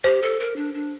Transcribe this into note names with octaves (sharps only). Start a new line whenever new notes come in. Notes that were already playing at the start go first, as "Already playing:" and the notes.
G4 C5
A4
A#4
D4
D4